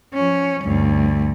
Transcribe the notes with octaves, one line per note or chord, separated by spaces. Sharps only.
F3 C#4
D2 G2